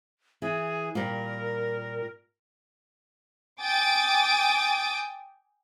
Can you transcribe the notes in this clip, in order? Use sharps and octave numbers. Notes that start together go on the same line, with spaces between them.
E3 G#4
A#2 G3 A#4
G5 G#5 D6 D#6 A6